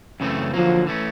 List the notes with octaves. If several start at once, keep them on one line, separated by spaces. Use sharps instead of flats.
F#2 C#3 E3 A3 C4
D3 F3 F#3 A#3
E3 A3 C#4